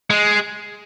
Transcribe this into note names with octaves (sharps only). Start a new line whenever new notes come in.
G#3